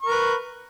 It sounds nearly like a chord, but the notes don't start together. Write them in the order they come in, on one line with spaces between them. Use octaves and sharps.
C#6 A#4 B4